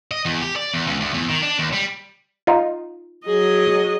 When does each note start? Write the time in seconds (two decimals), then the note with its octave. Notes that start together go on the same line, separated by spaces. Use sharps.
0.11 D#5
0.25 E2
0.42 G4
0.56 D5
0.74 E2
0.87 C#2
1.00 D2
1.14 E2
1.29 D#3
1.43 D4
1.59 D#2
1.73 G3
2.47 D#4 F4
3.26 F#3 G#4 D#5